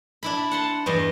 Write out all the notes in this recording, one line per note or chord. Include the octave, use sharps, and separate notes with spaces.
D4 E4 B5
F#5 A5 C6
E2 G2 D#5